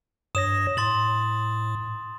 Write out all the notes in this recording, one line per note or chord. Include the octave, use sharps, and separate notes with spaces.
G2 C#5 D#6 A#6 E7
A2 C6 A6 F#7